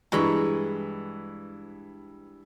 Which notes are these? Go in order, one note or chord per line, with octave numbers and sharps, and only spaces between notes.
G2 E3 G#3 A#5 B5 C#6